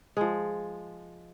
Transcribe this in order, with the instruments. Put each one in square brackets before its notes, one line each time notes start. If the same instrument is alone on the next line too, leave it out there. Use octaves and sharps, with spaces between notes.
[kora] F3 G#3